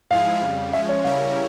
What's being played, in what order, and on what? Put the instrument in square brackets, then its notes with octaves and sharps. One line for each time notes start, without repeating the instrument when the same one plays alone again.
[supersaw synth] G#2 F3 G#3 E4 G#4 [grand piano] F5
[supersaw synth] F2 C#3 G3
[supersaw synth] F3 G#3 C#4 [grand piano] E5
[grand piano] C#5
[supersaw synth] C#3 G3 C#4 E4 A#4 [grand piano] F5